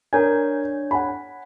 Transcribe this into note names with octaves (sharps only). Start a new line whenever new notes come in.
D4 A#4 C#5 G#5 G#6
F#5 G#5 B5